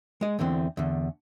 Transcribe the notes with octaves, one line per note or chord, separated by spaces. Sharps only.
G#3 D#5
E2 D3 E3 C4
E2 D3